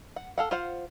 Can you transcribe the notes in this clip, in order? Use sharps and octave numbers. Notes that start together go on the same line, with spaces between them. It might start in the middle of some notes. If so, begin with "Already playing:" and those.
F#5
A4 F5 F#5
F4 C5 F5 F#5